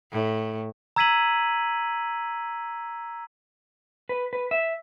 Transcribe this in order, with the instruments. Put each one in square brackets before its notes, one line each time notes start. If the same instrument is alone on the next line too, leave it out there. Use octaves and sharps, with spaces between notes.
[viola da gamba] A2
[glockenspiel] A#5 E6 G#6 B6 D#7 F#7
[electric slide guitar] B4
B4
E5